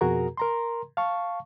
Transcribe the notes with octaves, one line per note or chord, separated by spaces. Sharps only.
F2 B2 F#4 G#4 A#4 A#5
A#4 A#5 C6
F5 A5 C#6